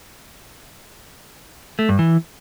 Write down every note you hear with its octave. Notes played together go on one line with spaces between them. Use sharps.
A3
G2
E3